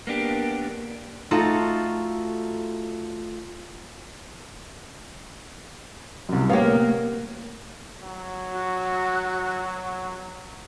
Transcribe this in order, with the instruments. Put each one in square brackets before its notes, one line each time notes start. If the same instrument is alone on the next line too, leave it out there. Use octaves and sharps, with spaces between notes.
[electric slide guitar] A#3 B3 D4 G4
[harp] A3 D#4 F4 F#4 A4
[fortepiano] C2 F#2
[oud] A#3 B3 [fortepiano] G4 C#5 F5
[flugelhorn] F#3
[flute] F#4